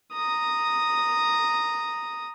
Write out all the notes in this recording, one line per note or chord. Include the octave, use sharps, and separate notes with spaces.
A#5 D#6